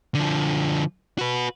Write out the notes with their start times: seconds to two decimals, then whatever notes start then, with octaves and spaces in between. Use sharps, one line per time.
0.15 D3 F3
1.19 F#4 B4